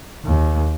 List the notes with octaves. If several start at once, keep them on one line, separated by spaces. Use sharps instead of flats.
D#2